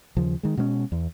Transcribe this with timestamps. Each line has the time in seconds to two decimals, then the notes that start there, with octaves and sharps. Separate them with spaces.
0.17 D#2 C#3 F3
0.43 D#3 G#3
0.57 B2 G#3 A#3 C#4
0.92 E2